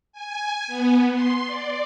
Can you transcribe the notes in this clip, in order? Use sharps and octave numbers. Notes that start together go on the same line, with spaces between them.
G#5
B3
C6
D5